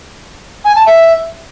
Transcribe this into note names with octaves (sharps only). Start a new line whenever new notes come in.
G#5
A5
E5